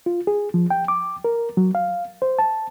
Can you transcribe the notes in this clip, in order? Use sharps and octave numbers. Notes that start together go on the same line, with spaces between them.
F4
G#4
F3
G5
D6
A#4
F#3
F5
C5
A5